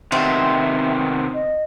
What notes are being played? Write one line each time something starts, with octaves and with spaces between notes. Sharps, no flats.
C3 D#3 B3 C4 E5
D#5